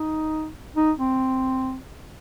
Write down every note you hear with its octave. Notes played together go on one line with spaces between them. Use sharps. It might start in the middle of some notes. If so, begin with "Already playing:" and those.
Already playing: D#4
D#4
C4